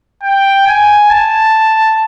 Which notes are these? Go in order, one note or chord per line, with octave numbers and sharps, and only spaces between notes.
G5
G#5
A5